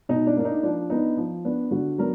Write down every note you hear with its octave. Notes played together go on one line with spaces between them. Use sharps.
B2 D#4
D4
A#3 D4
D#4
F3 D4
B3 D4 D#4
F3
B3 D4
D3 F#4
F#3 B3 D4 A#4